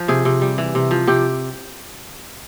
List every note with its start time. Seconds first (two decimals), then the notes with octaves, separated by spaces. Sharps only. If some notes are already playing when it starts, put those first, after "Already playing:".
Already playing: F3
0.08 C3 G#4
0.25 C3
0.42 G3
0.58 E3
0.75 C3
0.91 F3
1.07 C3 G4